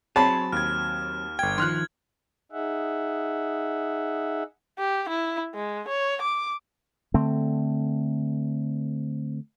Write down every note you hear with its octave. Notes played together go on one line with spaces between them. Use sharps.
F#3 C4 G#4 C#5 A5 B5
D#2 F6 G#6
G1 G5 G#6
D#3 F3 C6 F6 F#6
D#4 G#4 E5 F#5
G4
E4
G#3
C#5
D6
D3 A3 C4